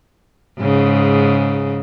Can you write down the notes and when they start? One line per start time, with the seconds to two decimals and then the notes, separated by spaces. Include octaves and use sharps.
0.59 G#2 C#3